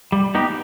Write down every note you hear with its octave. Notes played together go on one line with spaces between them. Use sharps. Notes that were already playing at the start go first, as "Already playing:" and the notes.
G3
B3 D#4 G4